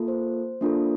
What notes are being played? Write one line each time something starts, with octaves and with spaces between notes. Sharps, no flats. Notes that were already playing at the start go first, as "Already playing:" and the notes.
Already playing: A#3 F4 A4
C5
A#3 D4 F4 A4